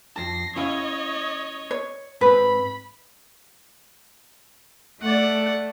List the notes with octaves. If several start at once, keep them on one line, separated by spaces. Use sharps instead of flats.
F2 A5 A#6 C7
C#4 E4 C#5 D#5 F5
C#5
G#2 C4 B4 B5
A3 D5 F#5